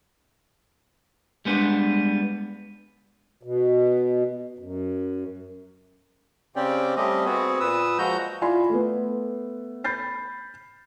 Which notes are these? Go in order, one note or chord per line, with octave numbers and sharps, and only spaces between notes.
G3 G#3 B3 D4
B2
F#2
C#3 C4 C#4 G4 D5 G5
G3 A3 C4 C#4 G4 D#5
B3 C4 F#4 G#4
A#2 B4 D#6 E6
F3 G#3 F#4 A#5 G6
E4 F4 D5 G#5 B5 C6
A3 B3
B5 G6 A6 C7